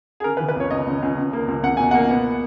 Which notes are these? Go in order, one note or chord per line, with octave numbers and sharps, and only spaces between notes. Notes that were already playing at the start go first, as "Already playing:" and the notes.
G#4
C#3 A#4
B4
E3
B4
C#2 C#5
C#2 D#5
C#2
C#2
C#2
A#3
C#2
C#2 F#5
B2 G#5
A#3 F#5
B3